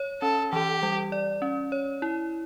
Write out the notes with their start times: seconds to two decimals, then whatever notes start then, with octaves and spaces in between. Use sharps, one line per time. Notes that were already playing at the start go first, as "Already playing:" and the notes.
Already playing: C#5
0.22 C#4 A4
0.52 E3 G4
0.83 G3
1.12 D5
1.42 C#4
1.72 C#5
2.02 E4